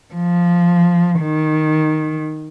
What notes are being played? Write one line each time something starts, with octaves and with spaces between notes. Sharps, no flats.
F3
D#3